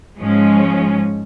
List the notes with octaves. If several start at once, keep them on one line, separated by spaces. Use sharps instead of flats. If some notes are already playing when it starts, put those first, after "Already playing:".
G#2 F3 G#3 C#4